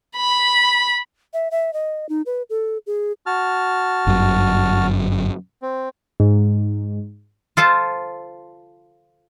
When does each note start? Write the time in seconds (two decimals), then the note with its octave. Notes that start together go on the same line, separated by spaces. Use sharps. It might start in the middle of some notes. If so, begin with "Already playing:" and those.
0.16 B5
1.33 E5
1.51 E5
1.73 D#5
2.09 D#4
2.26 B4
2.50 A4
2.87 G#4
3.26 F#4 A5 F6
4.07 G1 F#2
5.62 C4
6.20 G#2
7.57 F4 A4 C5 A5